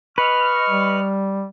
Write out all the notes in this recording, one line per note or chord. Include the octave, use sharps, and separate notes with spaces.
B4 D#5 C#6 F6
G3